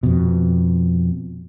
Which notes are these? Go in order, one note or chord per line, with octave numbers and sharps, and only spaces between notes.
F2 B2